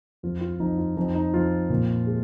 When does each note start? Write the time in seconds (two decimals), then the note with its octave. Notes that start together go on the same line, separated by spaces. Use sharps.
0.23 F2 F4
0.41 F4
0.59 F2 D#4
0.78 F4
0.97 F2 D#4
1.15 D#4
1.34 F2 F4
1.70 A#2
2.07 G#3